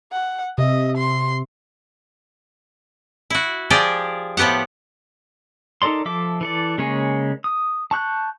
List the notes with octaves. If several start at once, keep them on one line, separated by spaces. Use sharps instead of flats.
F#5
C3 D#5 E5
C6
E4 F#4
F3 G4 G#4 D5
A2 F3 B3 G4 F#5
D#4 A4 A#4 D5 C6
F3 A4 E5 D6
E3 A4 D5
C#3 G#3 A#3 C#5 G#5
D#6
A5 C#6 F#6 G6